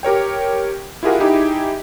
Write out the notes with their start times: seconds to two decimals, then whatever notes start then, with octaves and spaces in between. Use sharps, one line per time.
0.03 G4 A#4 C#5 G5
1.03 E4 F4 G4 G#4 A#4 F#5
1.20 D#4 E4 G4 G#4